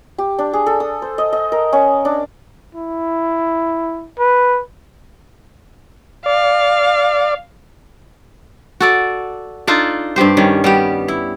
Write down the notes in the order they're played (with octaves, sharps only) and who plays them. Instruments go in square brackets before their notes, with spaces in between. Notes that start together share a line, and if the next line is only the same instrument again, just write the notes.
[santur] G4
D4
G#4
A4
D#6
C5
D#5
D#5
A#4
C#4
D4
[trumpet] E4
B4
[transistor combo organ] D5 [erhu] F5
[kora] F#4 A4 D5
D4 D#4 F4 A4
G2 C4 G4 C5
D#3 G3 C#4
G3 B3 G4
E4